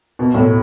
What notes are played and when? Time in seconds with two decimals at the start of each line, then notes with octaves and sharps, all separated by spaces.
0.19 B2
0.34 A2